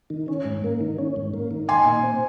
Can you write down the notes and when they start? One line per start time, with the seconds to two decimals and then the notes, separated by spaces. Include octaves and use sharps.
0.10 D#3
0.28 C#4
0.45 G#2
0.64 A#3
0.81 D#3
0.98 C#4
1.16 G#2
1.34 A#3
1.51 D#3
1.68 D#4 G#5 C6
1.86 A#2
2.03 C4